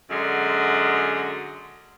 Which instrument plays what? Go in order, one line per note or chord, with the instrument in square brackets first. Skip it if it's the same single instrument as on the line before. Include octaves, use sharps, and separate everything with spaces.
[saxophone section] F#2 D3 G#3